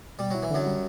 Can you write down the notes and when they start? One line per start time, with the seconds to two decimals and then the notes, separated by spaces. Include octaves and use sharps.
0.19 B2 G3
0.30 F#3 E4
0.43 E3
0.51 F#2 D3 F#3
0.66 G3